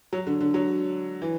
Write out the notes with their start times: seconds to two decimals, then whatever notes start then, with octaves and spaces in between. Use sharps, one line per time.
0.13 F#3
0.27 D3
0.41 D3
0.54 F#3
1.22 E3